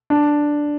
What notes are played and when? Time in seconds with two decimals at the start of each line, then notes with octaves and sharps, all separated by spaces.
0.10 D4